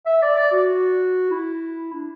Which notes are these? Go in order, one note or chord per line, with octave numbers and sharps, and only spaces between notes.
E5
D5
D5
F#4
E4
D4